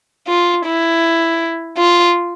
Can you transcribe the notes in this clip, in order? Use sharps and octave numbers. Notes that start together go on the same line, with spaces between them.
F4
E4
F4